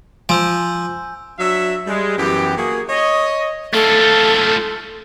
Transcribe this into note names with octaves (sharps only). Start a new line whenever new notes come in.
F3 G#5 E6 G6
F#3 D4 E5
G3 G#3
F#2 E3 B3 G4
A#3 F#4 G#4
C#5 D#5
A3 F4 A4